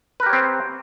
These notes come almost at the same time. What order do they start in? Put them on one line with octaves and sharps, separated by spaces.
B4 A#4 G4 C#5 C4